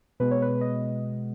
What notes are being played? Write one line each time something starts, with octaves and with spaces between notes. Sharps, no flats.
B2 G#3 B3 B4
C#5
B4
D#5